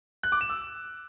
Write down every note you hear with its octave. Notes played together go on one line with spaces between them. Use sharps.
F#6
D6
E7
E6